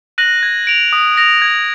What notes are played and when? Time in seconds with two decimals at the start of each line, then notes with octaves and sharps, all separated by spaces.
0.18 F#6 A#6 D#7 F#7
0.43 G#6
0.67 D7 F7
0.93 D#6
1.17 A#6 F7
1.42 G#6